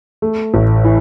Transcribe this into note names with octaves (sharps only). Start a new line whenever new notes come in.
A3
A1
E3